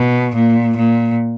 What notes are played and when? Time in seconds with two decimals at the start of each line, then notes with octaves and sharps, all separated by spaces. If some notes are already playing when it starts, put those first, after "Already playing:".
Already playing: B2
0.35 A#2
0.77 A#2